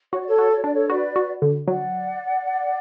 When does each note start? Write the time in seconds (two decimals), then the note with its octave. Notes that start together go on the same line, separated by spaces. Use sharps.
0.12 F#4 C#5
0.20 D5
0.27 A4 C#5
0.38 F#4
0.52 C#5
0.62 D4 D5
0.73 A4 C#5
0.89 F#4 B4 D5
1.16 F#4
1.42 D3
1.67 F#3 D5 F#5